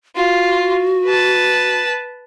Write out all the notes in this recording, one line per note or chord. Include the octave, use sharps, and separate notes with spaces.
F4 F#4
B4 A5